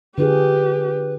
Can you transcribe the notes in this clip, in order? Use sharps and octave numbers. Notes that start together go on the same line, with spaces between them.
D3 F4 G4 G#4 B4